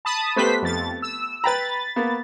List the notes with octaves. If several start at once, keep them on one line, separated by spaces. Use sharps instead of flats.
A5 B5 D#6
A3 B3 G4 B4 C5 B6
F2 A6
E6
B4 G5 A#5 B5 A6
A#3 B3